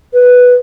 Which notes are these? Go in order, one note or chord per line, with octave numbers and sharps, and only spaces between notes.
B4